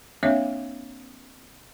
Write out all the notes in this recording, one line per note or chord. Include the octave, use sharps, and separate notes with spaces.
A#3 C4 D4 C#5 E5 F5